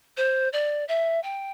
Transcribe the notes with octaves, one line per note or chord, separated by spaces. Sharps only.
C5
D5
E5
G5